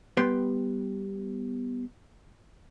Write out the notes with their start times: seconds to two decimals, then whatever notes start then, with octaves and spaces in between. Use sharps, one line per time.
0.17 G3 B3 G4 B4 G5 C6